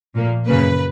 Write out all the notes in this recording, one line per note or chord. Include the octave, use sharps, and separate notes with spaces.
A#2 F3 A#3
F#2 C#3 F#3 A#3 B4